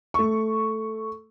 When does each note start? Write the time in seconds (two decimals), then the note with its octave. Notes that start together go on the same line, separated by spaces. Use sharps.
0.14 A3 C#6